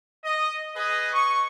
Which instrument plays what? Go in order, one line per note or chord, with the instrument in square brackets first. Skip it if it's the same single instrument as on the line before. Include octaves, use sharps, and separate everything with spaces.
[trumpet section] D#5
G#4 B4 D#5
C#6